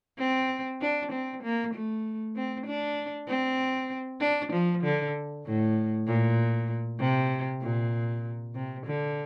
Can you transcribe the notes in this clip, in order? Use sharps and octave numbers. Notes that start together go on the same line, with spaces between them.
C4
D4
C4
A#3
A3
C4
D4
C4
D4
F3
D3
A2
A#2
C3
A#2
C3
D3